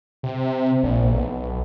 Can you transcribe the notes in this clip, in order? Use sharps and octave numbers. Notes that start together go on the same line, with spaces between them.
C3
A#1
B1